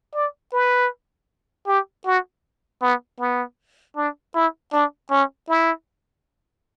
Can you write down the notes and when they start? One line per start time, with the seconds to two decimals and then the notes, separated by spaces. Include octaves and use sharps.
0.15 D5
0.53 B4
1.67 G4
2.06 F#4
2.82 B3
3.20 B3
3.96 D4
4.35 E4
4.73 D4
5.11 C#4
5.49 E4